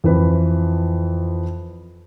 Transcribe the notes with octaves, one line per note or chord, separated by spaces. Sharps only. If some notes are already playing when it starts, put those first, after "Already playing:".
F2 E3 C4 B4